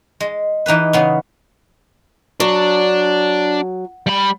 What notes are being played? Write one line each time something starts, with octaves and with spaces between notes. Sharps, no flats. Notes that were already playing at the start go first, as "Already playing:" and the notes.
G#3
E3 D#4 G4 B4
C#3 B3 C#4
F#3 D4
G3 B5